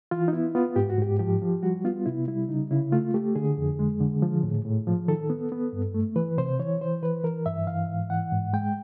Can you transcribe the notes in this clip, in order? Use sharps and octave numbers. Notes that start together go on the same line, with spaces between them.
E3 F4
D#4
B3 E4
B3 F4
G#2 G4
F#4
G#2 G4
F3 G4
F3
G3 F#4
B3 F4
C3 E4
G3 E4
C#3 D#4
C#3 E4
A3 F4
A3 G4
D3 G#4
F2
G#3
D3
F3
A2
A2
F3
D#3 A4
B3
B3
G2
A3
E3 B4
C3 C5
E3 C#5
E3 C5
E3 B4
E3 A#4
G2 E5
E3 F5
G#2
E3 F#5
G#2
G#3 G5